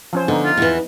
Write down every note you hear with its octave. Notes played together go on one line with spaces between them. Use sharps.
F3 C#4 C5
D3 B3 D#4
F4
E2 E3